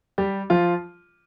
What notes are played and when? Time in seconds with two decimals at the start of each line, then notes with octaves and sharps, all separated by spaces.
0.18 G3 G4
0.50 F3 F4